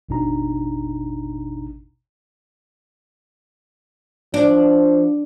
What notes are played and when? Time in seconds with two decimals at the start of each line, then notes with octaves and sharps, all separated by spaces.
0.09 G#1 E2 B2 D4 D#4 A#5
4.34 F3 D4